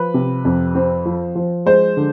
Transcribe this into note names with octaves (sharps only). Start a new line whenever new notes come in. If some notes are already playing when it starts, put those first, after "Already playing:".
Already playing: F3 B4
C3
F2
C4
F3
F3
G#3 C5
D3